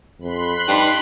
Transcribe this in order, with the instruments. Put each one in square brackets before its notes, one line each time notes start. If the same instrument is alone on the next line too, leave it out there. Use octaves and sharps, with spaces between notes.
[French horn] F2 [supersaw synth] B5 C6 F#6
[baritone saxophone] G2 [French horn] D#4